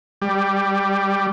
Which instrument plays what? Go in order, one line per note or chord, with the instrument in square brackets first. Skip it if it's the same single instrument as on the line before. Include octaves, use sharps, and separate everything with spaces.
[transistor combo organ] G3